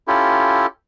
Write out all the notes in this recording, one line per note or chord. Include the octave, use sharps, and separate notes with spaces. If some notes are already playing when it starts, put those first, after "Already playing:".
C#4 E4 F4 G4 A4